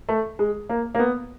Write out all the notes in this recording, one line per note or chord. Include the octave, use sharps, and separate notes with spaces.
A3
G#3
A#3
A#3
B3